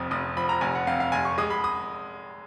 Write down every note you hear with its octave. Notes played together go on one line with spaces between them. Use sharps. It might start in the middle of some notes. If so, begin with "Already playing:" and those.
Already playing: F1 F2 F3 D#6
F1 D#6
F3 B5
A#5
F1 G#5
F#5
F2 F5
F5
F1 G#5
C#6
G#3 D#6
B5
D#6